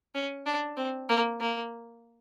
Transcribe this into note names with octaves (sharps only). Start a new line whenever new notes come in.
C#4
D4
C4
A#3
A#3